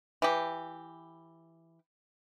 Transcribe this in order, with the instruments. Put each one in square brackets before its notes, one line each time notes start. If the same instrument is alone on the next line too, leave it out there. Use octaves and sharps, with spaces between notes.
[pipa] E3 G4